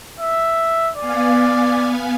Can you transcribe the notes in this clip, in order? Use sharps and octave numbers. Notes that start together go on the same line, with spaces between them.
E5
B3 D5 F5 G#5